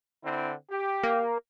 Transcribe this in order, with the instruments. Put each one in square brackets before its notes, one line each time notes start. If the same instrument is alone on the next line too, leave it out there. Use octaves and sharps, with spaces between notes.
[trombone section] D3 C4 E4
G4
[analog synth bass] A#3